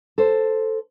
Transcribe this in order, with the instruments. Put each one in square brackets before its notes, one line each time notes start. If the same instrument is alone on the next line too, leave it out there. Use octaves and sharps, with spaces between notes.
[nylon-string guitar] A4 C5